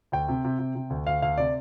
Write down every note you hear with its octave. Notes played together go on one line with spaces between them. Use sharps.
D2 G5
C3
C3
C3
C3
D2
D2 F5
D2 F5
C3 D5